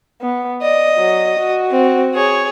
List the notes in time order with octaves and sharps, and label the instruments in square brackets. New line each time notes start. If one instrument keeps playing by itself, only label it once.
[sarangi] B3
[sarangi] D5 [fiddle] D#5
[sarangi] F#3
F#4
[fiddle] C4
G#4 C#5